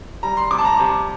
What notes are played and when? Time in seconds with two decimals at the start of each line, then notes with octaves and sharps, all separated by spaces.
0.23 G3 A#5
0.37 C6
0.51 C3 D6
0.59 A5
0.65 A#5
0.80 C3